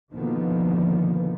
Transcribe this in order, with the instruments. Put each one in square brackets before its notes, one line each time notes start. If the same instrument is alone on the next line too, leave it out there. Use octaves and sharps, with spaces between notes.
[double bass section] B2 D3 D#3 F3 A#3 B3